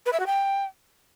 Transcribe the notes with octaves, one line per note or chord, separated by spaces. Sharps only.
B4
E5
F#4
G5